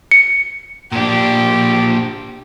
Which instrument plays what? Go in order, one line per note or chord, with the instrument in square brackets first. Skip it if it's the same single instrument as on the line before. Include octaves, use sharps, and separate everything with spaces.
[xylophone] C#7
[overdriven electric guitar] A#2 D4 [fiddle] G4